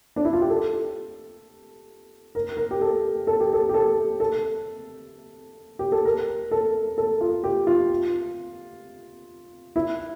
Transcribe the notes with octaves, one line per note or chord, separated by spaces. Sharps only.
D4
E4
F4
G4
A4
A#4
A#4
G4
A4
A4
G4
A4
G4
A4
A4
G4
A4
A#4
A4
A4
F4
G4
F4
E4